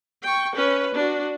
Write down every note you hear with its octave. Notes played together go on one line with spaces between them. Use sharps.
G5 C#6
C#4 B4
D4 F#4